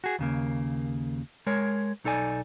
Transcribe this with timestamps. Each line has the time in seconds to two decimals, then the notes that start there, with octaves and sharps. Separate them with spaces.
0.04 F#4 G#4
0.19 D#2 C#3 A#3
1.47 G#3 A#4 C#5
2.04 B1 D#4 A4 D5 G#5